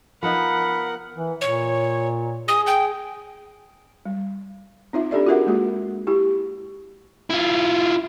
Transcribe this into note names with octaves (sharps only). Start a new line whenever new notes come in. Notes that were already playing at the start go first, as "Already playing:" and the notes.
F3 B3 D#4 A#4 F#5 B5
E3
A#2 C#5
G#4 D#6
G5
G3
C4 D#4 F4 E5
C4 D4 G4 A4 D5 E5
F4 F#4 G#4 A#4 E5 F#5
G#3 A#3 F#4 G#4
E4 G4
E4 F4